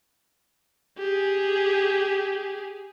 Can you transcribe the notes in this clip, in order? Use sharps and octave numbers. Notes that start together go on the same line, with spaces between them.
G4 G#4